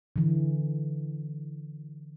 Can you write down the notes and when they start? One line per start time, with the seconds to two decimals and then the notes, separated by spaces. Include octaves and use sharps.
0.16 D3 E3